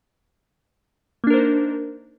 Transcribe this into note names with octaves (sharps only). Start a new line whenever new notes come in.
A#3 D4 D#4 A#4 C5